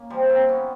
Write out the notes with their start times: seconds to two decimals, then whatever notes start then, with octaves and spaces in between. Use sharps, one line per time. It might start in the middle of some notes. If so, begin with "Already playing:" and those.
Already playing: A#3 C#4
0.10 F3 G3
0.29 A#3 C4
0.49 B3 C#4